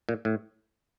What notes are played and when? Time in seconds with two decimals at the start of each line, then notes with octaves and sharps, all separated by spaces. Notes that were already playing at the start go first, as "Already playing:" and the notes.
0.09 A#2
0.25 A2